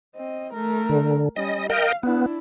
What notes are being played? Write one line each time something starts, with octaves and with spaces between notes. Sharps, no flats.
C4 D#5
A3 A#4
D3
G3 C#4 D#5
A#4 D#5 F5 G5
B3 D4 E4